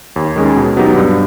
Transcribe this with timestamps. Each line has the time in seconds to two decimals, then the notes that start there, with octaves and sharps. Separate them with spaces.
0.16 D#2
0.36 D#3 G#3 C#4
0.56 B2
0.76 F#3 B3 D#4 G4
0.97 G2